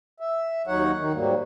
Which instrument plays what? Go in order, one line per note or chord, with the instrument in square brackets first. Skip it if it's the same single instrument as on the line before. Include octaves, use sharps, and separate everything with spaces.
[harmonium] E5
D#2 F#3 D#4 C#5 F#5
D#3 D#4
G#2 F#3 G3 A#3